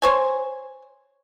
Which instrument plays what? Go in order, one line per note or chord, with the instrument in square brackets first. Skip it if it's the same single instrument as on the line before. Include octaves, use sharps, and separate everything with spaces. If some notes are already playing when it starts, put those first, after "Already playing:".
[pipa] C5 C#5 G#5